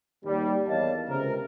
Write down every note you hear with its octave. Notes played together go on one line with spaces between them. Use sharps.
D#2 G3
E2 A#4 C#5 D#5 F5 A5
C#2 C3 A#4